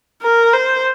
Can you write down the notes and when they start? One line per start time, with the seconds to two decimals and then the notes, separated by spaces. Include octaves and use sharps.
0.22 A#4
0.53 C5